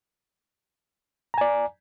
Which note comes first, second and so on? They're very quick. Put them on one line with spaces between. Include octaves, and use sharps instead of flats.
A#5 G#5 D5